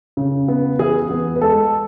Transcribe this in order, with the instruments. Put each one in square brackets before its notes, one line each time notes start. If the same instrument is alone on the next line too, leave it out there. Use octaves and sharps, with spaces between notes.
[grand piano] C#3
B3
E3 G#4
B3
B4
G#3 A4